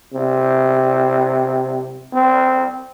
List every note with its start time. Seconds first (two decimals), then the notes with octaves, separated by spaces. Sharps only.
0.13 C3
2.13 C4